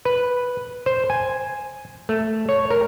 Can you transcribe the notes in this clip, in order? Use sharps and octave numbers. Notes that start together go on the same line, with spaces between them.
B4
C5
G#5
A3
C#5
A#4